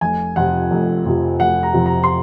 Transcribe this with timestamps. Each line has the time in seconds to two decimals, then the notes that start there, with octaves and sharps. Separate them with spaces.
0.01 F1 G#5
0.36 F2 C3 F3 F#5
0.71 F1
1.05 F2 C3 F3
1.40 F1 F#5
1.63 A#5
1.73 F2 C3 F3
1.86 A#5
2.04 C6